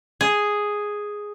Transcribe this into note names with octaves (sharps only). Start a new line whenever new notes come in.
G#4